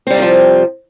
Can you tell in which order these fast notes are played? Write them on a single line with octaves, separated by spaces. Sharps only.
C4 G3 C3 D#3 F3